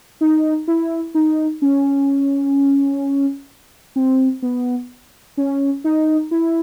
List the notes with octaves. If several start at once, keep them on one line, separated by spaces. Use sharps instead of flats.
D#4
E4
D#4
C#4
C4
B3
C#4
D#4
E4